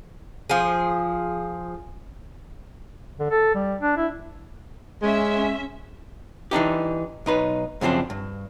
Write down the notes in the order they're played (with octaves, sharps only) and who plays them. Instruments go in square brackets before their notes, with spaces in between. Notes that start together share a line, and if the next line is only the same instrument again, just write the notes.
[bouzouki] F3 G#4
[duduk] D3
A4
G3
D4
E4
[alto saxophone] G#3 [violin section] C#4 E5
[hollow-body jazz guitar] E3 D4 D#4 G4
B1 D#4 B4
F#2 C#3 F3 C4 D4
G2